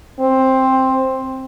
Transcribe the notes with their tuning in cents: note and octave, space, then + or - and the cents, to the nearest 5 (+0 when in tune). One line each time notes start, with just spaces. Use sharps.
C4 +10